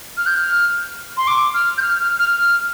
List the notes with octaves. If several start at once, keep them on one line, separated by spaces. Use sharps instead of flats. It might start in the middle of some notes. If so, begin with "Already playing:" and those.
F6
G6
F6
C6
D6
F6
G6
F6
F6
F6
F6